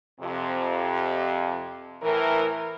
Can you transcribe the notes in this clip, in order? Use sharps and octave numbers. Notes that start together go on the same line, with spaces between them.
F2 C3
A2 E3 A#4